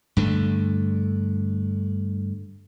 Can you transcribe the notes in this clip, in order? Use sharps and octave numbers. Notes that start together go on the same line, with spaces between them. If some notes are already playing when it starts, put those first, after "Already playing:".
G2 D3 A3